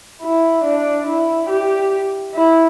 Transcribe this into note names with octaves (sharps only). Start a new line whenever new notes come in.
E4
D4
E4
G4
E4